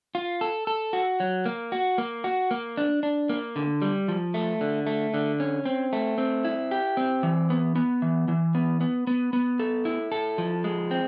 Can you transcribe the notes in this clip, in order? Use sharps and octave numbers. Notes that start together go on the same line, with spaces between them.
F4
A4
A4
F#4
F#3
A#3
F#4
A#3
F#4
A#3
D4
D4
A#3
D3
G3
F3
A3
D3
A3
D3
C#4
C4
A3
C4
E4
G4
C4
E3
B3
B3
E3
E3
B3
B3
B3
B3
A4
E4
A4
F3
G#3
C4